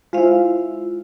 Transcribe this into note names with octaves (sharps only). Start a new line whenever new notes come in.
G#3 E4 F4 C5 F5